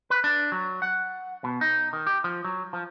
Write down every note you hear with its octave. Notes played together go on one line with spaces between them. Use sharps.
B4
D4
F#3
F#5
B2
D#4
D#3
G4
F3
F#3
F3